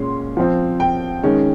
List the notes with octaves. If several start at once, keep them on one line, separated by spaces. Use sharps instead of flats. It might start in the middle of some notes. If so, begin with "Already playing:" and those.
Already playing: A#2 G#3 C#4 C6
F3 C4
G5
D#3 G#3 C#4